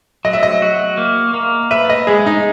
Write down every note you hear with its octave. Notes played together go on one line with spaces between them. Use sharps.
F#3 D#5
E5
D#5
F#4
A#3
A#3
B4 E5
D#5
G#3 G#4
D#4